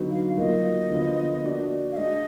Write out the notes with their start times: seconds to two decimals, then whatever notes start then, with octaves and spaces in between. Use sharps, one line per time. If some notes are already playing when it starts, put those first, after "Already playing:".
Already playing: D3 F#3 B3 D#4 F#4
0.11 F5
0.37 F#3 A#3 F4 D#5
0.90 D3 F3 B3 F4
1.43 A#3 D4 F#4 D5
1.92 F5
1.97 G#3 D4 F#4 D#5